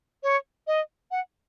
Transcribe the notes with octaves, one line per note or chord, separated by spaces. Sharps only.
C#5
D#5
F#5